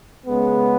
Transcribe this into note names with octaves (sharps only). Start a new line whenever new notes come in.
C#3 G#3 B3